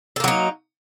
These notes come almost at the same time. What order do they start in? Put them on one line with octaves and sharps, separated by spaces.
A4 A#3 F#3 D#4